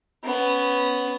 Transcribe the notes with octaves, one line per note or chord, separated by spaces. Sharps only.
B3 C#4